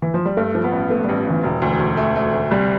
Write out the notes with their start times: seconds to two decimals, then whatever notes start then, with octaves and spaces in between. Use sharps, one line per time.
0.02 E3
0.14 F3
0.26 G3
0.37 G2 A3
0.55 F3
0.64 B3
0.72 A1
0.90 A3 B3
1.04 A1 G3
1.27 A1 E3
1.43 E1 E3
1.62 D2
1.80 D2
1.97 A3
2.16 A3
2.34 D2
2.51 C2 G3